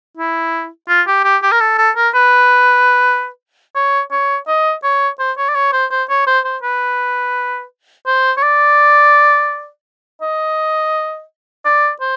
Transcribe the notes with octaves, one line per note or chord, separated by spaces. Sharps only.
E4
F4
G4
G4
G4
A#4
A4
A4
A#4
B4
C#5
C#5
D#5
C#5
C5
C#5
D5
C#5
C5
C5
C#5
C5
C5
B4
C5
C#5
D5
D#5
D5
C5